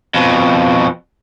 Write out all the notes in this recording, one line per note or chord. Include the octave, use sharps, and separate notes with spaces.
F2 B2